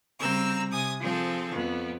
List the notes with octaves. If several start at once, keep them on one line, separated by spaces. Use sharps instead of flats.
C#3 G3 C4 A#5 E6
C3 G#5 D#6
F3 C4 G#4 A4
F2 B3